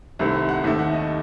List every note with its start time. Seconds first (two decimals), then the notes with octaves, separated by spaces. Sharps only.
0.19 C2 C3 D#3 A3 C4 E5
0.49 F#5
0.64 D#2 D#3 A3 E5
0.79 F#5
0.93 D#5